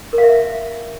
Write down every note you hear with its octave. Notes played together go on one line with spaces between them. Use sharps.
A#4
F5
E5